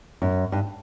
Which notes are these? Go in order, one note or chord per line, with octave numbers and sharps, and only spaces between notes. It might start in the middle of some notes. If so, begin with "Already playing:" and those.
F#2
G2